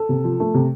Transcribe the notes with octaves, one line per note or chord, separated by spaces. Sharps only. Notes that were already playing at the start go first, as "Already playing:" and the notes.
Already playing: A4
C3
F3
A3
C3